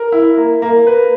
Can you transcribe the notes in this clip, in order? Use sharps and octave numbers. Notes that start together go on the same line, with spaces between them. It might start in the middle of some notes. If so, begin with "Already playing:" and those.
Already playing: A#4
E4
A#3
A#3
B4